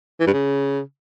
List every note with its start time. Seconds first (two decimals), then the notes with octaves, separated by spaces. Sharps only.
0.20 E3
0.27 G2
0.33 C#3